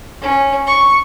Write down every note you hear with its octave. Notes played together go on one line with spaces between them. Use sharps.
C#4
C#6